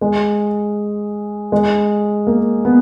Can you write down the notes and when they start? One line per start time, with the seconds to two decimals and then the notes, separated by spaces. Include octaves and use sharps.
0.01 G#3
1.52 G#3
2.27 A#3
2.65 B3